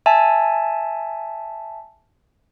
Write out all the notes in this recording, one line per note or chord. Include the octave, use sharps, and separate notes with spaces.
E5 G#5 A5